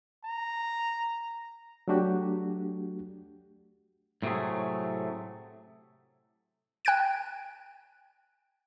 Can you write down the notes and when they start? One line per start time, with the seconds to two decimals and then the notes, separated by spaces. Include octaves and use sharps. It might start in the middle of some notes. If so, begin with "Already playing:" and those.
0.24 A#5
1.88 F#3 A3 D4 F#4 G4
4.22 A2 C3 F#3 A3 G#4
6.85 G5 F#6 G#6 D7